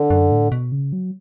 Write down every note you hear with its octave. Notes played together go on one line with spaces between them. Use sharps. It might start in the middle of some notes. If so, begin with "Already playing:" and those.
Already playing: D3
F#2
A2
B2
C#3
F#3